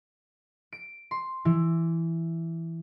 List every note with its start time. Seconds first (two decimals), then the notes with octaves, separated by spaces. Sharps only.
0.73 D7
1.11 C6
1.45 E3